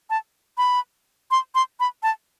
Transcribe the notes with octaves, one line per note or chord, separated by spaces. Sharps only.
A5
B5
C6
C6
B5
A5